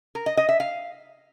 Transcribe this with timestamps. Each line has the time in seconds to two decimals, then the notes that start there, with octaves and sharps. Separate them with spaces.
0.15 A#4
0.26 D#5
0.37 D#5
0.49 E5
0.60 F5